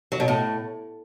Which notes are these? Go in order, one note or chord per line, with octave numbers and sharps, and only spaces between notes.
F#3
B2
A2